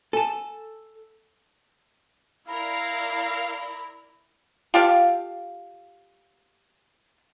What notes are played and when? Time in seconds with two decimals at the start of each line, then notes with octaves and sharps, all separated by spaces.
0.13 A4 G#5 A5
2.48 E4 A#4 D5 F5 B5
4.74 F4 G4 A4 F5